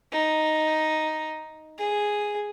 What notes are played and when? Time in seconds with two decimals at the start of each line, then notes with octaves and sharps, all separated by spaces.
0.12 D#4
1.79 G#4